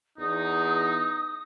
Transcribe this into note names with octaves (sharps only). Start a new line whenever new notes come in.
E2 D#4 D#6